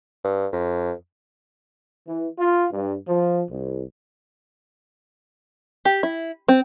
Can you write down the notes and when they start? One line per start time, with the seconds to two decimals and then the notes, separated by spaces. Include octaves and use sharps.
0.24 G2
0.52 F2
2.08 E3
2.39 F4
2.72 G2
3.08 F3
3.51 C2
5.85 G4
6.03 E4
6.48 C4